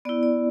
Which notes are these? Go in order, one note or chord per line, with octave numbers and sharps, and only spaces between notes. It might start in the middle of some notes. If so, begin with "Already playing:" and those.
B3 E4 D5
D5